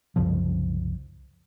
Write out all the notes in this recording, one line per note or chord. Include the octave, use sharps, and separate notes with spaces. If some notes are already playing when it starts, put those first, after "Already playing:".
C2 F#2 C#3 F3